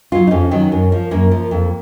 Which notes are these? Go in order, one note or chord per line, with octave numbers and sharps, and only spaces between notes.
D#3 F#3 F4
D#4
F2 C#4
D#3 F#3
F#2
F3
F#2 A#3
F3
F2